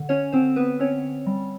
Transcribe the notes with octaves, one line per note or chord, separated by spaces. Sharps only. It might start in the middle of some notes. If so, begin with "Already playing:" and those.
Already playing: D3
C#4 C#5
D3 C4 C5
B3 B4
C4 C#4 C#5
G3